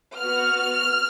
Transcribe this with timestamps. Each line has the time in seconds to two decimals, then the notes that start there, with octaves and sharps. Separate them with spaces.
0.18 B3 F#4 F6